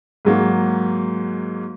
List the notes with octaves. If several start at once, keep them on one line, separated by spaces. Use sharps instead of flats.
G#2 F#3 A#3